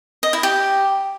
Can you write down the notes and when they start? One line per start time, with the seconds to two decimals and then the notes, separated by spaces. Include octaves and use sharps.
0.23 D#5
0.33 E4
0.43 G4